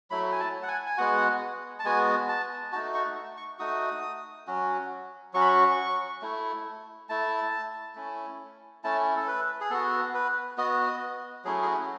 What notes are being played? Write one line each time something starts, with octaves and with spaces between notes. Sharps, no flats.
F#3 A3 E4 B5
G#5
A5
F#5
G#5
G#5
G#3 B3 F#4 F#5
A5
G#3 B3 F#4 G#5
A5
A3 D#4 F#4 A5
C#6
C#6
A3 D#4 F#4 D#6
F#3 C#4 F#4
F#3 C#4 F#4 C#6
B5
C#6
A3 E4
A3 E4 A5
A3 C#4 E4
A3 C#4 E4 A5
A4
B4
G#4
B3 F#4 A4
B4
B3 F#4 D#5
D#5
F#3 A3 C#4 E4 G#4
G#4
F#4